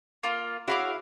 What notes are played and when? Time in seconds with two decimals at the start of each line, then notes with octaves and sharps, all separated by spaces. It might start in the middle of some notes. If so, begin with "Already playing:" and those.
0.23 A#3 F4
0.68 E4 F#4 G#4 C#5 F5 D6